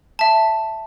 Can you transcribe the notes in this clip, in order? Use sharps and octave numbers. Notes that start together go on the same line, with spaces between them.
E5 A5